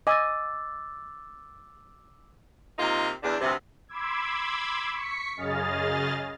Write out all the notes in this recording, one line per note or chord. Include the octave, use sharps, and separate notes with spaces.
D#5 G#5 D6 E6 A6
C3 A#3 D#4 F4
E2 D4
D2 G2 C3
B5 C6 D6 E6 G#6
C#6 B6 C#7
F#2 C#3 G#4 D#5 F6 A6